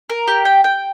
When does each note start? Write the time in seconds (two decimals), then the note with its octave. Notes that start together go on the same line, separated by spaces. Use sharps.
0.10 A#4
0.28 G4
0.45 G5
0.64 G5